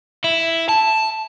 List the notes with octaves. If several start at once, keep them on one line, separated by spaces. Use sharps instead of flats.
E4
A5